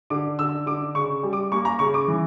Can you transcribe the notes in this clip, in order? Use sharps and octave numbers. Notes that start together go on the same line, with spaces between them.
D3 D6
D3 E6
D3 D6
C#3 C#6
G3
D6
A#3 C#6
A#5
C#3 C#6
D6
E3